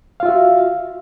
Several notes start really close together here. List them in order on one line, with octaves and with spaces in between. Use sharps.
F5 F4 E5 F#4